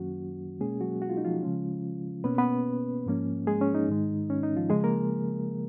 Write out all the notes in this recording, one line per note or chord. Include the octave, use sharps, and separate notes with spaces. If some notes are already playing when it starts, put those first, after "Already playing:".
Already playing: F#2 D#3 F#3 A#3 C#4 F#4
B2 G#3 A#3 C#4 G#4
F#3 F#4
F#4
F4
D#4
F3 F4
C#3 F3 G#3 C#4
B2 A#3 B3 C#4 B4
B3 B4
G#2 F3 A#3 C#4
G#3 G#4
C#4
D#4
G#2 D#3 G#3
C#4
D#4
F3 F4
C#3 F3 G#3 G#4
A#3 A#4